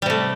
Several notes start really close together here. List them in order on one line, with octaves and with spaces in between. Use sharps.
G3 C3 A3